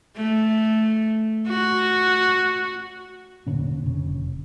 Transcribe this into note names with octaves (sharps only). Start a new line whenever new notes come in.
A3
F#4
E1 A#2 D3 C#4
F1 C#3